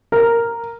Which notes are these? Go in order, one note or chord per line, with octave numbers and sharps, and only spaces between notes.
A#4